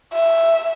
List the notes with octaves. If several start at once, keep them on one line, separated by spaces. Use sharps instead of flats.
E5